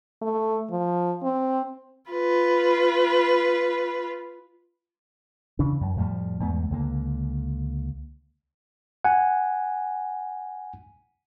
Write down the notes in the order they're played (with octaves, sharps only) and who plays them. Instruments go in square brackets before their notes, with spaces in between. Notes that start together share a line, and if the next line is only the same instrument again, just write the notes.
[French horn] A3
F3
C4
[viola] F4 B4
[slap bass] C#3 E3 D4
F#2
F2 A2 F3 G3
E2 G#2 A3 B3
C#2 D3 A#3
[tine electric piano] F#5 G#5